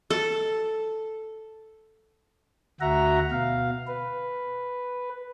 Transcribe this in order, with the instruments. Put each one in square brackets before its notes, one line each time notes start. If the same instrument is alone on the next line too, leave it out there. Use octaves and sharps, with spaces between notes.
[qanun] A4
[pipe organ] D2 F#4 E5 F#5 A#5
B2 F5
B4